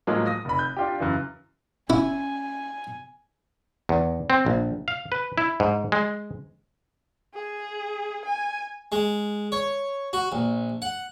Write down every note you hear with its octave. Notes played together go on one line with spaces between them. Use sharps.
A2 F3 F#3 G#3 A#3
D#6 A#6
F1 B5
G6
D4 F4 G4
F#2 C#3 E3
C#4 E4 G#5
E2
C4
A#1
F5
B4
E4
G#2
G#3
G#4
G#5
G#3
C#5
F#4
A#1
F#5